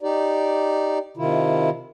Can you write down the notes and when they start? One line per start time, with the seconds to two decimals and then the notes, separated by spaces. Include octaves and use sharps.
0.01 D#4 G4 D5
1.17 C3 D#3 E4 F4